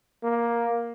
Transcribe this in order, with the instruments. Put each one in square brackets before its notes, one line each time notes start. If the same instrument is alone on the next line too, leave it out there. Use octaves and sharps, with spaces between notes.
[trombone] A#3